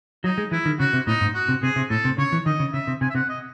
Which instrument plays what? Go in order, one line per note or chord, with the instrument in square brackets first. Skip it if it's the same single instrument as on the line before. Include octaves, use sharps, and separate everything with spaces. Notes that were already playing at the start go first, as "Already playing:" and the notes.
[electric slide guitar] F#3 [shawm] D#4
[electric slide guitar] G#3
[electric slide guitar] E3 [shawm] E4
[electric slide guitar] D#3
[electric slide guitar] C#3 [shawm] F#4
[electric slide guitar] C3
[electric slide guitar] A2 [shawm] D#4
[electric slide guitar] G#2
[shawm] F#4
[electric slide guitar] C3
[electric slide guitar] C3 [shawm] G#4
[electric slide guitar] C3
[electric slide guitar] A2 [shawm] A4
[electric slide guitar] C3
[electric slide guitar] C#3 [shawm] C#5
[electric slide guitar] E3
[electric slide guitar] D#3 [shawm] D#5
[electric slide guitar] C#3
[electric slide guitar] C#3 [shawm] E5
[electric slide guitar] C3
[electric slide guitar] C3 [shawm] G#5
[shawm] E5
[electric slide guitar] C3 [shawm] F#5
[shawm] D#5